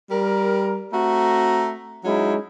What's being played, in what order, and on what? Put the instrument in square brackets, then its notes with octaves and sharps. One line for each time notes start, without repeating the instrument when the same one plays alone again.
[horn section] G3 A#4
A3 C4 F#4 A#5
F#3 G#3 C#4 D#4 E4